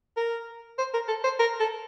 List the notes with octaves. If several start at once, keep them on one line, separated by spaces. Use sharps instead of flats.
A#4
C5
A#4
A4
C5
A#4
A4